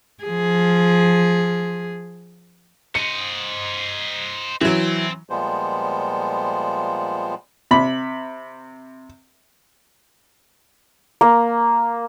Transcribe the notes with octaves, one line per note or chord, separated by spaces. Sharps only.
F3 G#4
C5 D#5 C#7
E3 F#3 C4
A#2 F3 G3 G#3 B3 C5
C3 B5
A#3